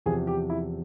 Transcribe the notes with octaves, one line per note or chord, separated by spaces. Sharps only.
E2 C3 F3 G#4
G4
E4